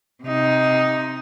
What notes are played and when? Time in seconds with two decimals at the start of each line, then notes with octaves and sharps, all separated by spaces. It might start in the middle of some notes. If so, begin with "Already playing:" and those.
0.23 C3 D#4